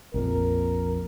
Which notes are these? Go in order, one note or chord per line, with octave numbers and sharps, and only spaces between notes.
A#1 F2 A#2 A#4